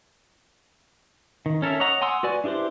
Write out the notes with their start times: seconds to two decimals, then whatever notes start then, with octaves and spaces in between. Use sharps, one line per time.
1.46 D#3
1.62 C#4 A4 A#4 E5
1.80 C#5 D#5 F#5 A#5
2.01 F#5 G#5 C6 D#6 E6
2.23 F#4 B4 D5 G#5
2.44 D4 E4 G4 B4 C5